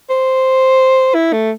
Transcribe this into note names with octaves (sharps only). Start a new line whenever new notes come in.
C5
E4
A3